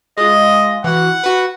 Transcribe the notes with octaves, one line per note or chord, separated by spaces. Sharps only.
G#3 F4 D#5
E3 F#4 F#5
F#4 B4